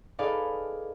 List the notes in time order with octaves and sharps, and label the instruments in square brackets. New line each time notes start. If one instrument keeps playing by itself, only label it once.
[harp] D#4 G#4 A4 B4 D5 F5